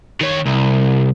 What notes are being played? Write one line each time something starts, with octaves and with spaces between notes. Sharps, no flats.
D#3 C#5
C2